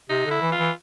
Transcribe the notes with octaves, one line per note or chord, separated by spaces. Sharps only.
C3 D#4
D3
E4
E3
F4
E3